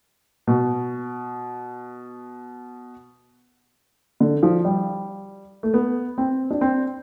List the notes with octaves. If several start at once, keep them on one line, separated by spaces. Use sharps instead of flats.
B2
D3
F3
G3
A3
B3
C4
D4
C4